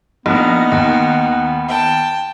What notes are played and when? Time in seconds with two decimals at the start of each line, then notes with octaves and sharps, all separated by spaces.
0.26 A#1 A#3 B3 D#4
0.72 D#2
1.68 G5 A5